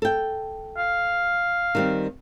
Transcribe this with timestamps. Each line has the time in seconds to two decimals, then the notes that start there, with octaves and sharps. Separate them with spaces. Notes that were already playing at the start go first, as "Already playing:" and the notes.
0.02 A4 G5
0.78 F5
1.75 D#3 G3 C4